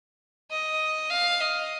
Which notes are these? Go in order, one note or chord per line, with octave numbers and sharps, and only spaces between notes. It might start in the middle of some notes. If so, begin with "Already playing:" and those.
D#5
F5
D#5